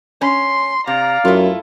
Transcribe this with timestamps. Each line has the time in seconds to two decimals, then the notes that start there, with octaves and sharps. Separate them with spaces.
0.21 C#4 C6
0.87 C3 D5 F5 A#5
1.25 F#2 A3 E4 F4